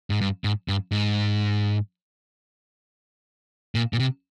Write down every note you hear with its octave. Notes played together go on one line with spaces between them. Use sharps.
G#2
G2
G#2
G2
G#2
A#2
A#2
C3